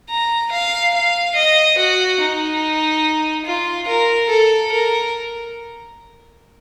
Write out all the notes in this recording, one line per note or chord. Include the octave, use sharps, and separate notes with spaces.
A#5
F5
F5
D#5
F#4
D#4
F4
A#4
A4
A#4